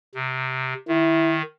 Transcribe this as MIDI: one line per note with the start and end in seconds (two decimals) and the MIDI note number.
0.15 0.74 48
0.88 1.42 51
0.88 1.39 64